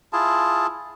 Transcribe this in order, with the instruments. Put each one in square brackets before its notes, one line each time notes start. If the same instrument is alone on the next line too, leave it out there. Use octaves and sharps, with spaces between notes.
[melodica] E4 F4 G#4 A5